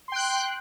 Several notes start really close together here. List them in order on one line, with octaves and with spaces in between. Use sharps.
C6 G5 F#6